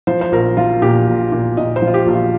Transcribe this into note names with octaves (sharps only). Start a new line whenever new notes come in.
F3 C5
C5
A#1 A#4
F3 F4
A#2 G4
A#1
A#2
A#2 D#5
C5
F3
F4
G4
A#1
F4